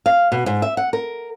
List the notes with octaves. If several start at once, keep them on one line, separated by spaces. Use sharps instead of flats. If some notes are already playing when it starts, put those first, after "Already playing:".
F5
B2
G#2
E5
F#5
A#4